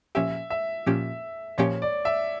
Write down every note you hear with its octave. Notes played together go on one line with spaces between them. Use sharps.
A#2 F3 C#4 G4 E5
E5
A#2 F3 C#4 G4
A#2 F3 C#4 G4 C#5
D5
E5